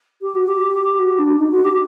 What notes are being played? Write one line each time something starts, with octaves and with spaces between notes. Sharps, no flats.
G4
F#4
G4
F#4
D4
D#4
F#4
G4